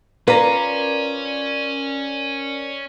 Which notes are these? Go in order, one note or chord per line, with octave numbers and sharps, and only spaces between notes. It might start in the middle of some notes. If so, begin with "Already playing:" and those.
C#4 F4 A#4 B4 D5 A#5